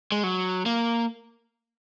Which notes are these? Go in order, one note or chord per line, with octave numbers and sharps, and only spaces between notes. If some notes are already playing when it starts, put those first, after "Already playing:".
G#3
F#3
A#3